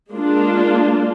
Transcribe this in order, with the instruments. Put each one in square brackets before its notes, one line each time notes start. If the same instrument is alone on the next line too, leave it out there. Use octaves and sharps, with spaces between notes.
[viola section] G#3 A#3 D4 F4